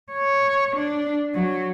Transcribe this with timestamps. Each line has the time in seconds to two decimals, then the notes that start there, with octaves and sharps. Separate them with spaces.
0.13 C#5
0.76 D4
1.35 F#3